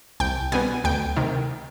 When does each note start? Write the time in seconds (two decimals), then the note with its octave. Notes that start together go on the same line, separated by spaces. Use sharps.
0.20 C2 G5
0.52 B2 G3 B3 G#5
0.84 D2 G5
1.17 C3 D#3